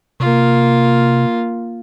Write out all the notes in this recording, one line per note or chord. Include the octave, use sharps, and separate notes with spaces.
C3 A#3 F4